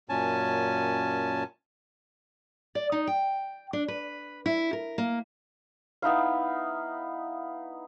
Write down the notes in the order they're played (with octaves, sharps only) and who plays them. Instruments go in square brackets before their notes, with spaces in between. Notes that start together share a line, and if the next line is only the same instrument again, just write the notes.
[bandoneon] F#2 A#2 C#4 G#5 A5
[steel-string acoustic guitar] D5
D#4
G5
D4
B4
E4
A#4
A#3
[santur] B3 D#4 E4 F5